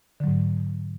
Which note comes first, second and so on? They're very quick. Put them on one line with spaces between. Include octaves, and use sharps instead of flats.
D3 F#3 G#2